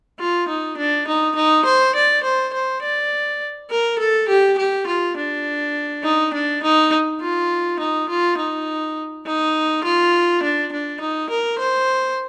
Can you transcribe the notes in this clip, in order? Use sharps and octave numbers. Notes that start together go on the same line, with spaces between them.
F4
D#4
D4
D#4
D#4
C5
D5
C5
C5
D5
A#4
A4
G4
G4
F4
D4
D#4
D4
D#4
F4
D#4
F4
D#4
D#4
F4
D4
D4
D#4
A#4
C5